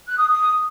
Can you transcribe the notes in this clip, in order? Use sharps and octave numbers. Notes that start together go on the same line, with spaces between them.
F#6
D#6
D#6